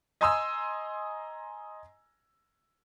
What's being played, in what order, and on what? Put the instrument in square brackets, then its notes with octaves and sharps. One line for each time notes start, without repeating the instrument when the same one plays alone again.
[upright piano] D#5 G#5 A#5 C6 D#6 E6